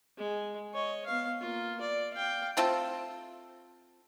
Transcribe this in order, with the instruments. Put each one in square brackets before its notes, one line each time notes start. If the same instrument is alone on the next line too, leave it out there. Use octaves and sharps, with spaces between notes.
[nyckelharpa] G#3
C#5 D#5
B3 F5
A#3 F4
D5
F5 G5
[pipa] A3 C4 F4 A4